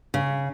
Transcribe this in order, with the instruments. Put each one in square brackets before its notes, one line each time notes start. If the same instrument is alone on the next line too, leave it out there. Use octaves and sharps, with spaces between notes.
[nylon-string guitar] C#3